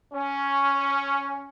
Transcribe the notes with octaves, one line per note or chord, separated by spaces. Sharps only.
C#4